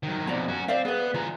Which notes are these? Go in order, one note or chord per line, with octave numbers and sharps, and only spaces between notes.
D#3 F#3
F2 B2 D5 A#5
C#4 F#4
C4 D5 E5 F5
B3 G#4 B4
E3 F4 A#5